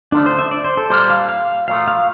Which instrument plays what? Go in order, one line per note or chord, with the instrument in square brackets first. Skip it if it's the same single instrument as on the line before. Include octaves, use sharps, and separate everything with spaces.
[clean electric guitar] D3 F3 A3 [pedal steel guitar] D4
[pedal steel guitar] C5
E5
D5
C5
A4
[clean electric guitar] A#2 G3 A#3 D4 [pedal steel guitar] C5
[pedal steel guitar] F5
F5
[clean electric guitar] A#2 F3 A3 [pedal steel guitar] F5
[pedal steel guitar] F5